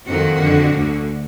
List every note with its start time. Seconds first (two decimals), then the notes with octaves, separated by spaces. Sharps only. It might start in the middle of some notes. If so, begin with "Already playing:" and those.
0.08 F2 D#3 F#4
0.40 F2 D3
0.73 D2 D3